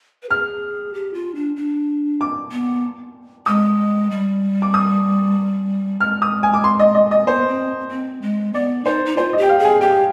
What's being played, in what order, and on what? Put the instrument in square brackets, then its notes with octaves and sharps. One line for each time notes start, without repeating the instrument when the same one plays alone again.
[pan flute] B4
[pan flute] G#4 [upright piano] F6
[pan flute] G4
F4
D4
D4
[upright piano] D6
[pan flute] B3
[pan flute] G#3 [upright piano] D#6
[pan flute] G3
[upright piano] D6
D#6
[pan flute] G#3 [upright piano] F6
[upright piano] D#6
G#5
D6
C6
D#5
D#5
D#5
[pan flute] B3 [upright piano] C5
[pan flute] C4
C4
G#3
[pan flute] B3 [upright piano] D5
[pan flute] D#4 [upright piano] C5
[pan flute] D#4
[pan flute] F4 [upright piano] C5
[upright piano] D#5
[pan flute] G4 [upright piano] G5
[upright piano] F5
[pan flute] G#4
[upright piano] G#5
[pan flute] G4 [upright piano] G5